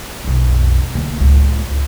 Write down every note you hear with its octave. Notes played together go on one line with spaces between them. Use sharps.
B1 F2
D3 A#3
C#2 A2